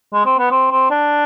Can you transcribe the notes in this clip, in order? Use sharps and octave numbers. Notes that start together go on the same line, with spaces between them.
G#3
C4
B3
C4
C4
D4